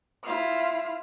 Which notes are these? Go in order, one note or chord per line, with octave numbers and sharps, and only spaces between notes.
E4 F4 F6